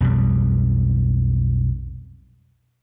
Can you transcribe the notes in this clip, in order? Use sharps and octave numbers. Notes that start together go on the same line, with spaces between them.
B1 F2 B2 G3